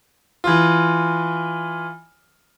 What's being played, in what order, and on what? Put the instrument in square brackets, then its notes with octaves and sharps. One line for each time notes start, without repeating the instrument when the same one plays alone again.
[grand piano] E3 F4